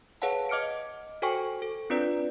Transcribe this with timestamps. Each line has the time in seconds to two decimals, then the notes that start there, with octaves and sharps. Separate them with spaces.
0.22 G#4 B4 C#5 F5 F#5 A5
0.49 D#5 D6 F6 C#7 D7
1.22 F#4 A4 C5 G5 G#5 C#6
1.62 A4
1.90 C4 D4 F4 B4 D5